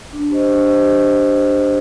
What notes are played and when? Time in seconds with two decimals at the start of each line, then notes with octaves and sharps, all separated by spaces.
0.13 D4
0.30 G4 C5 D#5
0.48 D4
0.65 G4 C5 D#5
0.83 D4